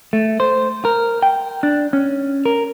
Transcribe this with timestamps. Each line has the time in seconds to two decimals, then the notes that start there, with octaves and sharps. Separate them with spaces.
0.13 A3
0.40 C5
0.85 A#4
1.23 G5
1.63 D4
1.93 C#4
2.45 A#4